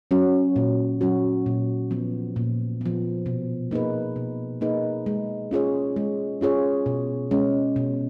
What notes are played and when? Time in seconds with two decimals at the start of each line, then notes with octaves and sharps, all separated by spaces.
0.11 F#3 C#4 F#4
0.56 A#2
1.01 F#3 C#4 F#4
1.46 A#2
1.91 F3 B3
2.36 A#2
2.81 F3 B3
3.26 B2
3.71 A#3 D#4 G#4 B4
4.16 B2
4.61 A#3 D#4 G#4 B4
5.06 G#3
5.51 C#4 F4 G#4 C#5
5.96 G#3
6.41 C#4 F4 G#4 C#5
6.86 B2
7.31 G#3 C#4
7.76 B2